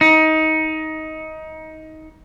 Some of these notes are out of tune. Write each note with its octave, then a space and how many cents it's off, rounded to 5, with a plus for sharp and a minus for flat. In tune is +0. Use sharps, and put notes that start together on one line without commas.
D#4 +20